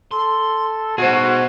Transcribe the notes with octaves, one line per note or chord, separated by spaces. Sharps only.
A4 C6
B2 F#4 G#4 C5